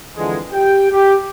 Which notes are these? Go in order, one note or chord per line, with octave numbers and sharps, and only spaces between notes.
F2 D3 E3 G#3
G4 G5
G4